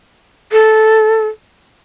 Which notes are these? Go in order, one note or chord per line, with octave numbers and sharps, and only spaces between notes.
A4